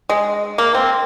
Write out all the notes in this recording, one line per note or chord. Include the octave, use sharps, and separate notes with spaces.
G#3
A#3
C4